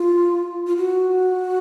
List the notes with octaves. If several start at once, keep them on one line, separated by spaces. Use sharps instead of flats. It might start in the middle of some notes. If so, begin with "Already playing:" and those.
Already playing: F4
F4
F#4